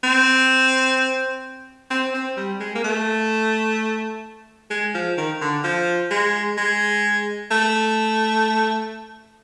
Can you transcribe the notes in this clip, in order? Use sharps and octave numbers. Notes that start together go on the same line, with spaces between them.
C4
C4
C4
G3
G#3
A#3
A3
G#3
F3
D#3
D3
F3
G#3
G#3
A3